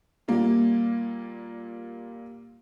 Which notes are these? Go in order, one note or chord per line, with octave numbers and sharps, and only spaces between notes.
A#2 G3 A#3